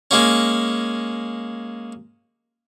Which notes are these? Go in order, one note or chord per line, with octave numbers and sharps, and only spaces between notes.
G#3 A#3 C#4